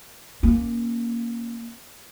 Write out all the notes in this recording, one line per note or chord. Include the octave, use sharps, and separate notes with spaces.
A#3 C#4